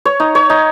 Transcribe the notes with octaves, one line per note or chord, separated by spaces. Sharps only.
C#5
D#4
C#5
D#4